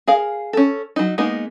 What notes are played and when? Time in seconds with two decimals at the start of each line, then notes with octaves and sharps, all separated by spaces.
0.07 G#4 A#4 F5
0.53 C#4 A4
0.96 F#3 D#4
1.18 G#3 A#3 B3 D#4